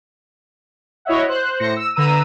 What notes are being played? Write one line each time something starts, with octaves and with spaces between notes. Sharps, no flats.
E4 F#4 C#5 D#5 E5 F#5
C5 F#6
A2 C5 A#6 C#7
E6
D3 B4 A#5 E6 D#7